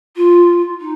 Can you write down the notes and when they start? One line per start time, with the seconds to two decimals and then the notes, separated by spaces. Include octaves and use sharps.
0.16 F4
0.81 D#4